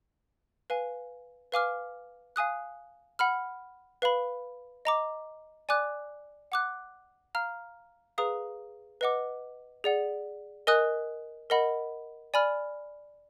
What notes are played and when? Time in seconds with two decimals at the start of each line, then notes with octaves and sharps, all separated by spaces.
0.70 B4 F5 G#5
1.52 B4 F5 G#5 D6 F6
2.36 F5 G#5 D#6 F#6
3.19 F#5 B5 F6
4.02 B4 F5 B5
4.85 D#5 A#5 D6
5.69 D5 G#5 D6 F#6
6.52 F#5 D6 F#6
7.35 F5 A#5 F6
8.18 G#4 B4 F5 A#5 D#6
9.01 B4 D#5 F#5 D6
9.84 G#4 D5 F#5
10.67 A#4 D#5 G#5 D#6 F#6
11.50 A#4 D#5 F#5 B5
12.34 D5 G#5 B5 F6